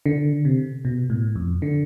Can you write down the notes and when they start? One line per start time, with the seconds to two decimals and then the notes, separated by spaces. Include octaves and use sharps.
0.06 D3
0.45 C3
0.85 B2
1.10 A2
1.36 F2
1.62 D3